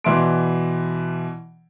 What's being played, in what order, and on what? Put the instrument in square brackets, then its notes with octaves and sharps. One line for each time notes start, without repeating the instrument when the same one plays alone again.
[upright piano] B2 E3 D5 E5 C6 D7